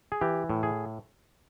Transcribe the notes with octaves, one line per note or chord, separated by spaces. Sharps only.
G#4
E3 G4
A2
G#4